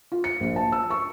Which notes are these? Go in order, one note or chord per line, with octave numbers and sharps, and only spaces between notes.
F4
C#7
A#1
A5
E6
C#6